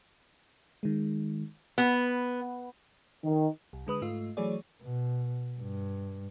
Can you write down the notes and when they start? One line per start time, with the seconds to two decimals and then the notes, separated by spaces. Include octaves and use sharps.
0.83 D#3 G#3
1.78 B3
3.24 D#3
3.73 C2
3.87 D3 G#3 B4 D#6
4.02 G#2 A3 F4
4.37 E3 F#3 A3 G#4 C#5 D5
4.82 B2
5.60 G2